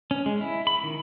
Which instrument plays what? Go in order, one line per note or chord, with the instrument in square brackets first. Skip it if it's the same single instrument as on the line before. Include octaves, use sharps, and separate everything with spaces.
[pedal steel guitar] C#4
G#3
E4
B5
D#3